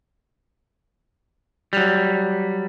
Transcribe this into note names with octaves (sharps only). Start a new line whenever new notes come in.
F#3 G3